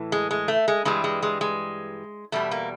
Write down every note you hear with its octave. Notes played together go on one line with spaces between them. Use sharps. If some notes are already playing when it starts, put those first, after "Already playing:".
Already playing: A2 E3
G#3
G#3
A3
G#3
G2 E3 G3 G#3
G#3
G#3
G#3
E2 B2 G3 A3
A#3